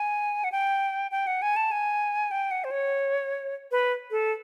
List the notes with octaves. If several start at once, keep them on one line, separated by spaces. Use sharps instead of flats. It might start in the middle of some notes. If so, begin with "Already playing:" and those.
Already playing: G#5
F#5
G5
G5
F#5
G#5
A5
G#5
G5
F#5
C5
C#5
B4
A4